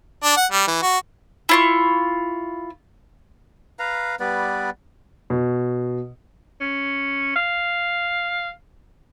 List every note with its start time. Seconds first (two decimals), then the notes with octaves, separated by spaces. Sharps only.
0.24 D4
0.37 F#5
0.52 G3
0.68 E3
0.82 F#4
1.49 E4 F4 C#6
3.79 B4 F5 A#5
4.20 G3 B3 B4 D5
5.30 B2
6.61 C#4
7.36 F5